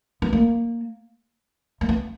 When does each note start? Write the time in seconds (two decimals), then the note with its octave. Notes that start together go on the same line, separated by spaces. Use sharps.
0.22 B3
0.33 A#3
1.81 A#3
1.89 B3